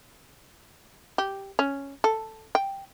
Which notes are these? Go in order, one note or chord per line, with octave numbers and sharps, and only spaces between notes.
G4
C#4
A4
G5